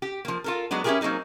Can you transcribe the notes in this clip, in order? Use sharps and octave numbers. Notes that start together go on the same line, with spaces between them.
G4
F3 A#3
F4 A4 A#4
F#3 G#3 B3 D4
C#4 E4 F4 G4 G#4 A#4
F#3 A#3 C4 D#4 G#4